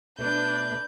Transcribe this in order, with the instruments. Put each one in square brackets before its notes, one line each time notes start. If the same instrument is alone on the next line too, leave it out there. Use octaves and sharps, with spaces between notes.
[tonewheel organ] B2 A3 [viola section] D4 [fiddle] B4 [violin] G6